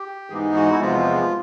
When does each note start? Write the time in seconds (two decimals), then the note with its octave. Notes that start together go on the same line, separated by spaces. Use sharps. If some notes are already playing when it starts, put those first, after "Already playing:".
Already playing: G4
0.30 G#2 E3 G#3 B3 D#4 G#4
0.55 F#4
0.72 E4
0.80 E2 C3 F3 G#3 B3 F4